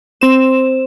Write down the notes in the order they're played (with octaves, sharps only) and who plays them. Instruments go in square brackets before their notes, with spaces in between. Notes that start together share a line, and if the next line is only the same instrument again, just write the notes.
[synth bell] C4 E7 [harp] C5 E6